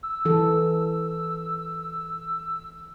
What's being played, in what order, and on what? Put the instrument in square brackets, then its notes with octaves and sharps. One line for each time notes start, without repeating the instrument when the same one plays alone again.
[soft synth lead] E6
[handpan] E3 A4